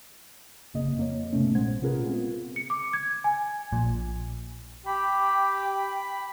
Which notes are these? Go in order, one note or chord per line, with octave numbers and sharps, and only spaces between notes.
G#1 F2 C#3 A#3 D#5
F2 A#3 C#5
F2 G#2 C3 A3 B3 C#4
A#1 A#2 G#3 C5 F#5 G#6
C3 C#4 F4 G#4 A#4 B4
G#3 B3 C4 F4 G#4
C#7
D6
G#6
G#5
A#1 A#2
G4 G5 B5